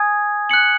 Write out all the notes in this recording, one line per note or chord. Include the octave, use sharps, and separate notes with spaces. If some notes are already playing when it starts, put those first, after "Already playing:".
Already playing: G#5 D#6 G#6
F#6 C#7 F#7